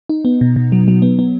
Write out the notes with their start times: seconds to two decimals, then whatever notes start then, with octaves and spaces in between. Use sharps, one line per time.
0.09 D#4
0.25 B3
0.41 B2
0.56 B2
0.72 F#3
0.88 F#3
1.02 B3
1.19 B3